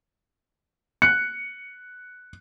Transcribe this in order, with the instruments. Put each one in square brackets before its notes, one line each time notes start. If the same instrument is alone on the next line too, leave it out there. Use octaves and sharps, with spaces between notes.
[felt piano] F#6 C#7